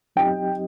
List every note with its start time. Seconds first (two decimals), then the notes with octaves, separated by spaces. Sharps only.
0.16 F#3 C4 D#4 G4 D#5 G5